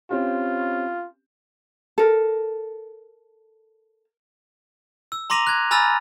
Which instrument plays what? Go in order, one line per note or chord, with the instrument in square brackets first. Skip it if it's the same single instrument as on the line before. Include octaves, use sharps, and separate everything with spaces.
[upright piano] C4 C#4 G4 [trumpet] F4
[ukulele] A4 A#4
[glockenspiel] E6
A#5 C6 D6 A#6 D#7 F7
F#6 G#6
G#5 A#5 B5 E6 F6 A6